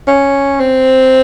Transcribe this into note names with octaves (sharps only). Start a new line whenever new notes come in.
C#4
C4